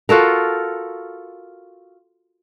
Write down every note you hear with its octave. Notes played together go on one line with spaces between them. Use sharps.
F4 F#4 A4 A#4